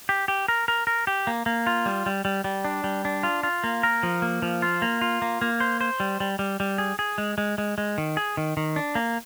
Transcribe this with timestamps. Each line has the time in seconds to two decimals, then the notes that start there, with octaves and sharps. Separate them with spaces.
0.09 G4
0.28 G4
0.48 A#4
0.68 A#4
0.87 A#4
1.07 G4
1.27 A#3
1.46 A#3
1.67 F4
1.86 G3
2.06 G3
2.25 G3
2.44 G3
2.65 D4
2.84 G3
3.05 D4
3.23 F4
3.43 F4
3.64 A#3
3.83 A#4
4.03 F3
4.22 A#3
4.42 F3
4.62 F4
4.82 A#3
5.02 F4
5.22 A#3
5.42 A#3
5.60 C5
5.81 C5
6.00 G3
6.20 G3
6.39 G3
6.60 G3
6.78 G#4
6.99 G#4
7.18 G#3
7.38 G#3
7.58 G#3
7.78 G#3
7.98 D#3
8.17 G#4
8.37 D#3
8.57 D#3
8.76 D4
8.95 A#3